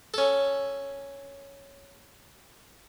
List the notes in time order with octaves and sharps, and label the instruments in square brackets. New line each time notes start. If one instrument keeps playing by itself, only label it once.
[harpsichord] C#4 A4